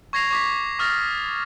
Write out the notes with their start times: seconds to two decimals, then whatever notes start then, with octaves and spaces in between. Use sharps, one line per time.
0.13 C#6 G#6 A#6 C7 F7
0.30 C#6 D6 B6
0.79 C#6 D#6 F6 A6 A#6